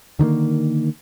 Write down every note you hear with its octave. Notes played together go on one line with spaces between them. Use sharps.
D3 D#3 G#3 A#3